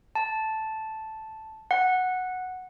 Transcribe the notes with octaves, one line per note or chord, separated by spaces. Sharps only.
A5
F#5